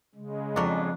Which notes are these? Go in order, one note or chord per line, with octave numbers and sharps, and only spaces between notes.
C#3 G#3
F2 F#3 D4